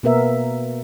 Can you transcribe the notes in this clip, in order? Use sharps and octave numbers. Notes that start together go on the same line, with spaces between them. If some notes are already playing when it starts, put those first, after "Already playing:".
B2 A#3 B3 A#4 E5